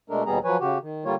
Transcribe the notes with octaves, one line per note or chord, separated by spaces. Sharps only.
B2 G#3 A3 D4 A4 A#4
D#2 B2 G3 B3 G#4 A#5
F3 F#3 B4 C#5 G#5
C#3 F#4 G4
D#3
D3 G3 A#3 F4 C#5